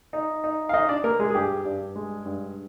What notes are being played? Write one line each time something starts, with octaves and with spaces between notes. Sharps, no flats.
D#4
D#4
F5
D#4 D#5
D4 D5
A#3 A#4
G#3 G#4
G#4
G2 G4
G2
G#3
G2